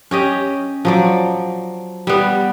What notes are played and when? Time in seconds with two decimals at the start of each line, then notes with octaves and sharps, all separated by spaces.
0.11 C#4 G4 D#5
0.85 F3 F#3 D5
2.07 G3 B3